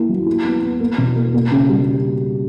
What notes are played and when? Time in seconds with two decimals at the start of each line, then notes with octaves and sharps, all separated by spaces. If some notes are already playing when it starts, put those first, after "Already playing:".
Already playing: A#3 E4
0.09 F#3
0.26 E4
0.45 B3
0.63 B3
0.80 A#3
0.98 B2
1.16 A#3
1.34 A#3
1.51 C#3
1.69 G3